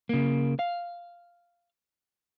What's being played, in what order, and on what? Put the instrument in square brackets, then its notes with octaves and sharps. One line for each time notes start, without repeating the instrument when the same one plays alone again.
[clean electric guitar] C#3 A#3
F5